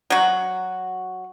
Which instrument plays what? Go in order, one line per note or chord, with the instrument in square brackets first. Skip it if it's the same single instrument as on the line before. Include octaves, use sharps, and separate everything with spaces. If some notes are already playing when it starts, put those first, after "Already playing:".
[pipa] F#3 F#4